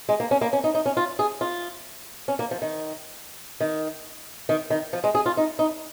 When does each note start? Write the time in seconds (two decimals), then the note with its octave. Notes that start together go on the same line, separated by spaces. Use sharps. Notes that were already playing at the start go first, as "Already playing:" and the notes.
0.09 G#3
0.20 A#3
0.31 C#4
0.41 A#3
0.53 C#4
0.64 D#4
0.75 D#4
0.86 C#4
0.97 F4
1.19 G#4
1.41 F4
2.28 C#4
2.39 A#3
2.51 F3
2.62 D#3
3.60 D#3
4.49 D#3
4.70 D#3
4.93 F3
5.04 G#3
5.15 G#4
5.26 F4
5.37 D#4
5.59 D#4